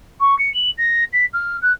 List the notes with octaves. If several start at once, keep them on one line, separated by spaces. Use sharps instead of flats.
C#6
C#7
F#7
A#6
B6
F6
F#6